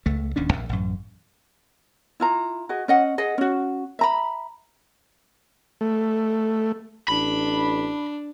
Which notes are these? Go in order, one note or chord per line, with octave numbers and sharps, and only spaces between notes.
C#2 A3
D1 D#2 C#4 D4
A#1
A1 F#2
E4 F4 A#5
F#4 G#4 D#5
C#4 D#5 F#5
G#4 D#5 F#5
C#4 F#4
E5 A#5 B5
A3
A1 D4 B5